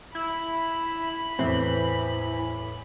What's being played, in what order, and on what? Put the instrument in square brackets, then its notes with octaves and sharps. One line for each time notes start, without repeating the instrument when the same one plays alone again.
[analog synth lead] E4 [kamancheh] B5
[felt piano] E2 A2 [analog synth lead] E3 [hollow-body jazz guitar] C4